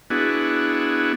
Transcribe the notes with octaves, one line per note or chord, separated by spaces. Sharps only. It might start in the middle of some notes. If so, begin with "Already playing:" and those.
B3 D4 E4 F#4 G#4